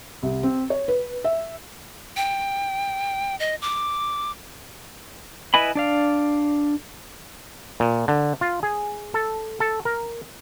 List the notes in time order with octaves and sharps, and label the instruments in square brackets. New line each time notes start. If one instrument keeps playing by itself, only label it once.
[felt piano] C2
C4
C#5
B4
E5
[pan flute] G5
D#5
D6
[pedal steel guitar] E4 B4 D#5 G#5 B5
D4 D5 F5
[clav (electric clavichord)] A#2
D3
F4
G#4
A4
A4
A#4